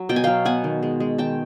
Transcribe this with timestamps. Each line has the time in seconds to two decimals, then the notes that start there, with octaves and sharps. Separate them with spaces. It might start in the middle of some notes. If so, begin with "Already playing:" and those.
Already playing: F#3
0.09 B2 G5
0.16 G#5
0.24 F#3 F5 G5
0.45 B3 F#5 G#5
0.64 D#3
0.83 G#3
1.00 G#3
1.18 D#3 G5 A5